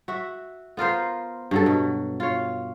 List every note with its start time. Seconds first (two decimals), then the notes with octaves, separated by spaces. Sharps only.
0.08 F#4 E5
0.77 B3 F4 A#4 C5
1.51 G2 F#3 A4
1.66 B2
2.20 F4 C#5